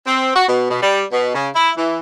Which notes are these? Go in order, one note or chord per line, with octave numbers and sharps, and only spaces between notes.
C4
F#4
B2
B2
G3
B2
C#3
E4
E3